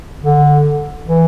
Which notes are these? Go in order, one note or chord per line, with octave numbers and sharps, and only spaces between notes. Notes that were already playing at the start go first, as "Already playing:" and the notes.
D3
E3